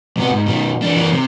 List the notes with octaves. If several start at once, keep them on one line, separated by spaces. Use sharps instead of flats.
C3 B3
G#2
B2 D#3
E3 D4
E3 A#3
C3